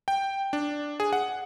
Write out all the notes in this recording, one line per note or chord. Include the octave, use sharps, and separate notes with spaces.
G5
D4
G#4
F#5